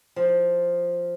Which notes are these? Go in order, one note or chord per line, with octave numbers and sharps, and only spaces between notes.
F3